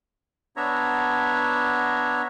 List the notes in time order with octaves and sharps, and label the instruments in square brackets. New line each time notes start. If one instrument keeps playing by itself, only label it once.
[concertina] B3 D4 C#5 E5 A#5